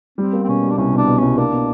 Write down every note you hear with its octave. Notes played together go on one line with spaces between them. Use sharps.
G3 C4
A#3
C4
B2 C#4
G3
D4
C2 C#4
B2 D4
B2
C2 C#4
A#3 D4
B2